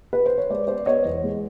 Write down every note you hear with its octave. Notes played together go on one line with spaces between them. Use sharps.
B4
C5
C#5
G#3 C5 D5
B3 C5 D5
B3 C#5 D#5
E2
G#3